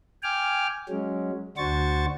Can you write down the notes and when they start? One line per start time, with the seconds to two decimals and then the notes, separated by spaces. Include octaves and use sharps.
0.23 G5 G#5 D6 F6
0.89 F#3 G#3 C#4
1.57 D2 D4 F#4 C5 C#6 A6